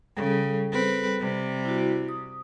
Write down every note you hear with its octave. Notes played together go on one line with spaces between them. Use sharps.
C#3 G3 G#4 A4
C4 B4
C3 G3
E4 F#4
D#6